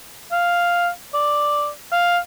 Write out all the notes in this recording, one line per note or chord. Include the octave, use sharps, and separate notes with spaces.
F5
D5
F5